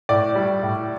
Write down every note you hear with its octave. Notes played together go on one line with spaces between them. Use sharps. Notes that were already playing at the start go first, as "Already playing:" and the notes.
A2 D5
G3
A2